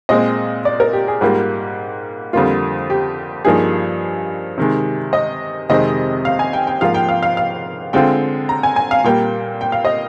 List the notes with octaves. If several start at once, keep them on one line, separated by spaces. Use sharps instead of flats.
A#2 G#3 C4 D#5
D5
A#4
G4
G#4
G#2 G3 A#3 F4 G4
F2 D3 G3 A#3 F4
G4
G2 F3 A#3 D#4 G#4
C3 D#3 G#3
D#5
F2 C3 D#3 G#3 C4 D#5
F5
G#5
G5
G5
G#2 F3 A#3 F4 F5
G5
F5
F5
F5
D3 G#3 C4 F4 G5
A#5
G#5
G#5
F5
A#2 G3 A#3 G5
G5
F5
D#5